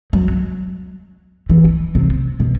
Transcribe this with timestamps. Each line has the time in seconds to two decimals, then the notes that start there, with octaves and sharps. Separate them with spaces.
0.13 F#3
1.50 E3
1.95 C3
2.40 B2